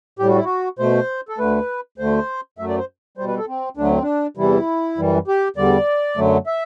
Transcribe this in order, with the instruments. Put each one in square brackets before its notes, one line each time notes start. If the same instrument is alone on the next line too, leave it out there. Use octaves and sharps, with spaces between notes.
[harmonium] A2 G3 G4
F#4
E4
F#4
B2 A3 C5
A4
D2 D3 A3 B4
D2 D3 A3 C5
F#2 F#3 A3 E5
D5
C5
G3 C5
B2
B4
A4
C4
D2 D3 F#3 A3 D4
C4
D4
E2 C3 E3 G3 E4
F#2 E3 G3
G4
E2 D3 G3 D5
F#2 D3 F#3 A3
E5